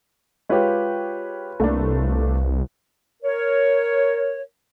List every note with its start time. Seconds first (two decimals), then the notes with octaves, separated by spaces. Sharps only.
0.49 G#3 F4 G4 B4 C#5
1.60 C2 A3 A#3 D4
3.23 A#4 C#5